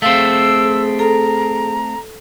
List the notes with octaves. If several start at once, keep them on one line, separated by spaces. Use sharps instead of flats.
A3 C4 G#4 F5 E6
A4 A#5